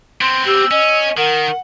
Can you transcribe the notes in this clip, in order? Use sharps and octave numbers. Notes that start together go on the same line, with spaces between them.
B3 C4 C6
G4 E6
C#4 D#5
D#3 A#4 F#5